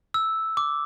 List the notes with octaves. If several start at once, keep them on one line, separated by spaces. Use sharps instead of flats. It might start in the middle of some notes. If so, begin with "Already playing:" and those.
E6
D6